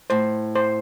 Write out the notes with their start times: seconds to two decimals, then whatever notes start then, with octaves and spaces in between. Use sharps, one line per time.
0.10 A2 C5
0.56 C5